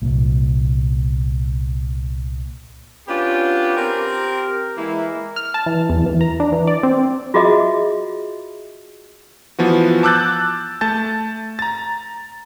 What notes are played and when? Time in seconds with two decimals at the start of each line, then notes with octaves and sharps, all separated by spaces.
0.02 C2 A#2
3.08 B3 C#4 D4 F4 G4
3.77 C4 G4 A#4
4.78 E3 G#3 A#3 E4
5.36 F6
5.54 A5
5.66 E3
5.90 E2
6.06 E3
6.21 A#5
6.40 D4
6.52 E3
6.67 D5
6.83 C4
7.34 F4 F#4 G#4 D#5 E5
9.59 E3 F3 B3 F#4
10.03 A5 D6 E6 F#6 G6 A6
10.81 A3 A5 G6 A6
11.59 A#5 A6